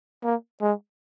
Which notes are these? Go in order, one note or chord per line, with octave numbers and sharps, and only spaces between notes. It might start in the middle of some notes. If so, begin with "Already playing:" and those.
A#3
G#3